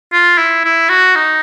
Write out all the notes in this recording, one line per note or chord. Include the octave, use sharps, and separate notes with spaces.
F4
E4
E4
F#4
D#4